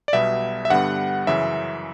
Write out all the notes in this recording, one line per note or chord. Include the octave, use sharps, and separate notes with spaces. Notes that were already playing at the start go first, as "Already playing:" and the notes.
D5
B1 B2 G3 B3 E5
E5
G2 D3 G3 B3 F#5
F#2 C#3 E3 E5